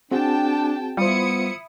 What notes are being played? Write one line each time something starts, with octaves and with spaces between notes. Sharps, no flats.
C4 D4 F#4 G#4 G5 A5
G3 B3 E4 F4 C5 D#6 C#7